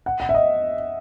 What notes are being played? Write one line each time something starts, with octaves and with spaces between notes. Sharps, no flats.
F#5
F#5
E5
D#5